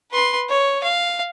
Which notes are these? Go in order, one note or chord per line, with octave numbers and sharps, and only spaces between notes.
B4 C6
C#5
F5